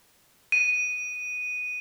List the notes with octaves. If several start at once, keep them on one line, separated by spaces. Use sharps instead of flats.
D#7